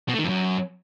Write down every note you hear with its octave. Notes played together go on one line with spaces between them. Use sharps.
B2
A3
D#3
F2
F#2